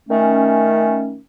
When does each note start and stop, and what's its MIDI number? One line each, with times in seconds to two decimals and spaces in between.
0.09 1.18 51
0.09 1.18 57
0.09 1.18 61